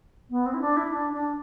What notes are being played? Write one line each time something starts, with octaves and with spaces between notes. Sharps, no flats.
B3
C4
E4
D4
E4
D4
D4